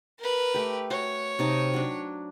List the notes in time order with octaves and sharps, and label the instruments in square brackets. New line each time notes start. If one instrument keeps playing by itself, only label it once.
[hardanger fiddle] A#4 B4
[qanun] A3 G4
[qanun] F#4 [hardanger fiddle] C#5
[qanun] C3 D#4 A5
F#3 D4